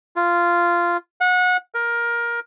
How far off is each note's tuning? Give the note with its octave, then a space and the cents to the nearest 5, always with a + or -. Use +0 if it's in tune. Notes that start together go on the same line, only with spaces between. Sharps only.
F4 -10
F#5 -25
A#4 +15